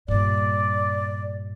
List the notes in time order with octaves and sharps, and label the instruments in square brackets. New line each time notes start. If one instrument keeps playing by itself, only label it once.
[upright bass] G2 A#2 [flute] D5